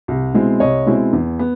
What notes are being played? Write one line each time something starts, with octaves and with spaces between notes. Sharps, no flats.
C2
B2 G#3 C4 E4
C2 C#5 D#5
B2 G#3 C4 E4
E2
B3